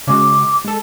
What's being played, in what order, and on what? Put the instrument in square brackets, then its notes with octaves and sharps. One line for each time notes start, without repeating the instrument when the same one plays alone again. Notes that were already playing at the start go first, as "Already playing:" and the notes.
[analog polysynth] C#3 G#3 F#4 [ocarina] D6
[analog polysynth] G#3 A4